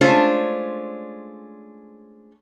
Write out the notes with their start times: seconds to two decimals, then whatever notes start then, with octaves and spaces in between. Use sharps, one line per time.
0.01 G#3 A3 C#4 D4 F4 C5